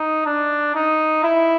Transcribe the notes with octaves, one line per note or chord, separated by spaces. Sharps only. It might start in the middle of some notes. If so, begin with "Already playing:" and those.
Already playing: D#4
D4
D#4
E4